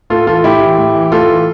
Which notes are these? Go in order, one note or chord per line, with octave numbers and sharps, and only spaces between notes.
A2 F4 A4
E3 F4 A4
A2 E4 G4
E3
A2
E3
A2 F4 A4
E3